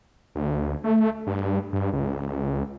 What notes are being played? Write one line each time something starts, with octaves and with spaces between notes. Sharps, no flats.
D2
A3
G2
G2
C#2